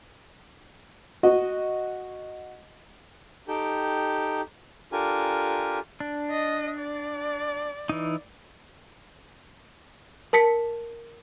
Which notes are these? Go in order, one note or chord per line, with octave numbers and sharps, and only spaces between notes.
F#4 D#5
D#4 G4 A4 G5
D4 F4 G4 A4 A#4 G#5
D4
D#5
D5
E3 D#4
A#4 A5 B6 C#7